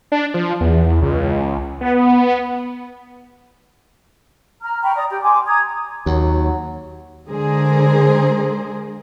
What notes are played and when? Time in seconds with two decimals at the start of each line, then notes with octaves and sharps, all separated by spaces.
0.12 D4
0.34 F3
0.61 E2
1.02 C#2
1.81 B3
4.62 A#5 F6
4.82 G5 A#5 B5 C#6
4.96 D5 A#5 D#6
5.10 G4 G5
5.22 G#5 C6 D6
5.46 A#5 D#6 G#6
6.06 D#2 F#3
7.27 D3 G#3 G#4 A#4 C5